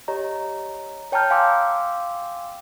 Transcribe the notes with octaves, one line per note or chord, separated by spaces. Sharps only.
G4 C#5 D#5 A#5
C#5 G5 A5 A#5 F6 G6
F5 G5 G#5 C6 D6 E6